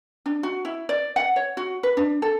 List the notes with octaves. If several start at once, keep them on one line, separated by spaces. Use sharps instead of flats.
D4
F#4
E4
D5
F#5
C#5
F#4
B4
D4
A4